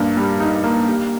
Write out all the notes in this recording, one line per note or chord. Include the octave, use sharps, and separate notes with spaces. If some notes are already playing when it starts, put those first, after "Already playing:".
Already playing: G2 A#3
G3
D#4
A#3
G4